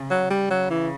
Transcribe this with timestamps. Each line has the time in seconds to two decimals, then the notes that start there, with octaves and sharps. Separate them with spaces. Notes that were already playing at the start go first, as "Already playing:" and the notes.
Already playing: C#3
0.10 F#3
0.30 G3
0.50 C#3 F#3
0.70 E3